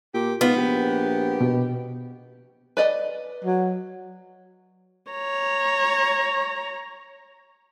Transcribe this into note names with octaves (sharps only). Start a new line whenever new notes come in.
A#2 G4
G#2 B3 F4
A#1 G4
B2
B4 D5 D#5
F#3
C#5 A#5